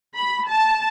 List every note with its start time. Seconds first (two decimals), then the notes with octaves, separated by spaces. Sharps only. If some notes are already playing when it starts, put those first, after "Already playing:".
0.15 B5
0.48 A5